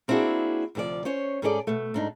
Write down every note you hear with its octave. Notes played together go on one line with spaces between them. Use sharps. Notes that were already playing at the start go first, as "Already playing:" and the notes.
A#3 C4 D4 E4 F#4 G#4
D2 C3 F3 G4 D5
C#4 C5 C#5
G#2 C#4 G#4 A4 C5 D5
B2 A3
G#2 D4 D#4